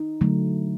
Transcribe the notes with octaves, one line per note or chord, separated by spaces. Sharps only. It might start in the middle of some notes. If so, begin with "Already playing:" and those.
Already playing: D#4
D3 F#3 A3